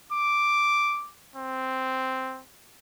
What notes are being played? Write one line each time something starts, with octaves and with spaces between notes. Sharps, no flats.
D6
C4